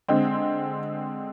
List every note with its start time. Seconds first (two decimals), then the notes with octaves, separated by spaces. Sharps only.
0.08 D3 G#3 C4